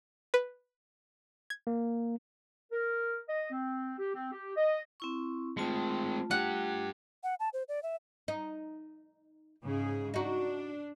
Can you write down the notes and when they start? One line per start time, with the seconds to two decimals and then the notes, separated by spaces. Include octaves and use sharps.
0.34 B4
1.50 G#6
1.67 A#3
2.72 A#4
3.29 D#5
3.50 C4
3.98 G4
4.15 C4
4.32 G4
4.56 D#5
5.00 C4 E4 C#6
5.57 G#3 A3 C4 F4 A5
6.31 D4 G4 F#5
7.23 F#5
7.40 A5
7.53 C5
7.69 D5
7.83 E5
8.28 D#4
9.64 G#2 C#3 G#4
10.14 D4 D#4 F#4